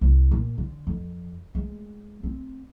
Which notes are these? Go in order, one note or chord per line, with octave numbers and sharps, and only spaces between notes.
C2
A#2
D3
F2
G#3
C4